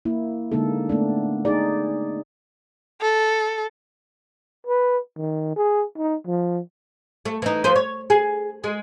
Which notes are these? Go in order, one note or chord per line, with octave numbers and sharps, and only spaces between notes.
A#3 E4
D3 G#3 A#3 D#4 A4
A3 B3 D4
D#4 G#4 D5
A4
B4
D#3
G#4
D#4
F3
A3
E3 D#4
F3 B4 C5
C#5
G#4
G#3